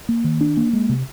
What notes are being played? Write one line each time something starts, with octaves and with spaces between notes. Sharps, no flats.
A#3
D#3
D4
A#3
G#3
C3